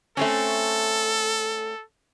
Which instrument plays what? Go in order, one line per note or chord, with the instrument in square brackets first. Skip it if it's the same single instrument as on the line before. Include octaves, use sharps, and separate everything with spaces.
[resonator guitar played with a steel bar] A3 C4 C#4 [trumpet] A4